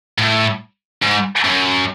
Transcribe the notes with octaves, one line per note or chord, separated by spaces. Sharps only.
A2
G#2
F#2